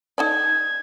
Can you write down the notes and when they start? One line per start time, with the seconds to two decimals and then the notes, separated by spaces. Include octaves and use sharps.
0.18 D#4 A4 D5 G#6